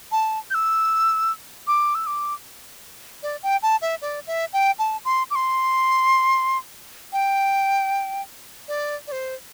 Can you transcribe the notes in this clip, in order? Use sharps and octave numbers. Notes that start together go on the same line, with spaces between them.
A5
G6
E6
D6
E6
D6
D5
G5
A5
E5
D5
E5
G5
A5
C6
D6
C6
G5
D5
D5
C5